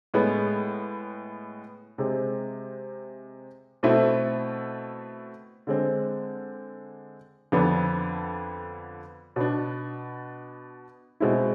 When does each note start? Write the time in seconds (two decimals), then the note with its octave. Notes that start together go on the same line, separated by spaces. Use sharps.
0.14 A2 G#3 B3
1.98 C3 G#3 C4
3.83 B2 A3 C4 E4
5.67 D3 G#3 C4
7.52 F2 D3 F3 B3 D4
9.36 B2 B3 D4
11.20 B2 G#3 C4 E4